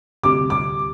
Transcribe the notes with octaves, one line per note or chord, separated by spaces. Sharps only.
D2 C3 G3 D6
D6